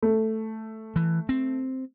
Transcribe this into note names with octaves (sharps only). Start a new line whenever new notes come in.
A3
E3
C4